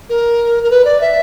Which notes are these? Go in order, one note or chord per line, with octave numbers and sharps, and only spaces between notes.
A#4
A#4
B4
D5
E5